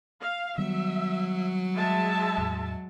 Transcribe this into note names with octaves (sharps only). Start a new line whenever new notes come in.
F5
D#3 F#3 G3 B3 E5
G#3 E5 A5
E2 A2